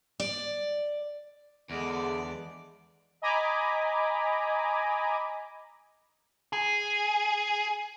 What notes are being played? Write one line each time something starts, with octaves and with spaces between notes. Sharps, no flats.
D5
E2 D3 G#3 D5
D#5 G#5 A#5 B5 D6
G#4